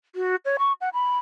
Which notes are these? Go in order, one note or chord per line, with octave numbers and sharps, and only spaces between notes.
F#4
C#5
C#6
F#5
B5